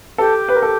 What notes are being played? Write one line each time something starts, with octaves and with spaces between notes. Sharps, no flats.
G4 A4
B4
A#4
A4